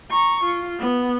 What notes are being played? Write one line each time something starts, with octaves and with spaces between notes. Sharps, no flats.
A#5 C#6
F4
B3